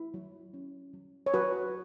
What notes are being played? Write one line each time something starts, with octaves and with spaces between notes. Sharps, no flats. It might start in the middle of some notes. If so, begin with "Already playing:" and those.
Already playing: E4
F#3
C#4
F#3
C#5
F#3 F#4 B4